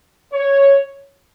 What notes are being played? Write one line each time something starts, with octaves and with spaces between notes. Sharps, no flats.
C#5